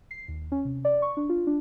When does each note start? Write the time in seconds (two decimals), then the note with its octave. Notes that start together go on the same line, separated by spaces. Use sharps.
0.11 C7
0.28 D#2
0.52 C#4
0.65 C3
0.85 D5
1.02 C#6
1.17 D4
1.29 F4
1.47 D4